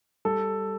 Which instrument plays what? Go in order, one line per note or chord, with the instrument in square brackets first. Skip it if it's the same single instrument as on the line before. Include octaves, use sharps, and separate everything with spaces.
[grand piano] G3 A4